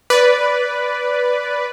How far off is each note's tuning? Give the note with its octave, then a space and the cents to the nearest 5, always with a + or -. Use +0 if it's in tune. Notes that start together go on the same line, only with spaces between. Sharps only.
B4 +0 D5 -10